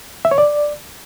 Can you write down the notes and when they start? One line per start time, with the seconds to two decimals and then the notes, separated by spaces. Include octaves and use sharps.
0.25 E5
0.31 C#5
0.38 D5